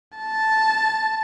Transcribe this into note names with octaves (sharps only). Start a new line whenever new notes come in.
A5